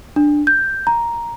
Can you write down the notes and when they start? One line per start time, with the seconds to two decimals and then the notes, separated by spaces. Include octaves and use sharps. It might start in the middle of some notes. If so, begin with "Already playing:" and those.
0.16 D4
0.47 G6
0.87 A#5